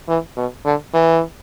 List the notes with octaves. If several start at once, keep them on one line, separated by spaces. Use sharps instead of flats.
E3
B2
D3
E3